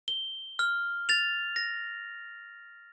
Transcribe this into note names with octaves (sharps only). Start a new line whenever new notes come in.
G7
F6
A6 F7
A#6